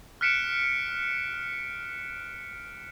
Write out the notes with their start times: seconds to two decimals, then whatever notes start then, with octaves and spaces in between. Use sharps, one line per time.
0.21 F6 F#6 B6 C#7 D7 E7